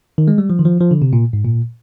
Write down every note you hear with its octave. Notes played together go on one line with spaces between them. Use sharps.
D#3
G#3
G3
F3
D#3
F3
F3
D3
C3
A#2
G#2
A#2